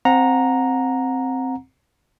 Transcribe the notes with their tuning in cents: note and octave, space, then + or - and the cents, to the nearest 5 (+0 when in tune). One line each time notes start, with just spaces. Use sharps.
C4 +0 F#5 -30 A#5 +0